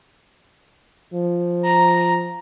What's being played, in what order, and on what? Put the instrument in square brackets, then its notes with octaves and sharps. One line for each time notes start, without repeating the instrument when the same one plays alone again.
[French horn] F3
[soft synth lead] A#5